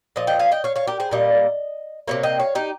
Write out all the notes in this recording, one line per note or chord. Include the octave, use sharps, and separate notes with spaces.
A#2 F3 D#5
D#5 G5
F5 G#5
D#5 G5
C#5 F5
C#5 F5
G4 A#4
G#4 C5
A#2 G3 A#3 D#5
C3 G3 A#3 C#5 F5
D#5 G5
C#5 F5
D#4 G4